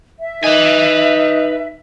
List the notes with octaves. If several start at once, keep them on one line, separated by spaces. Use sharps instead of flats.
E5
D#4 B4 G#5